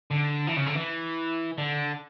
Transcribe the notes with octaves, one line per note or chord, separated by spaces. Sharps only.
D3
E3
C#3
D3
E3
D3